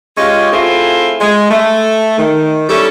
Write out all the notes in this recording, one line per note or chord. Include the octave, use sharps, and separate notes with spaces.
G#3 C#4 F4 G4 D#5
A3 C4 E4 F4 G#4
G#3
A3
D#3
G3 C#4 E4 A4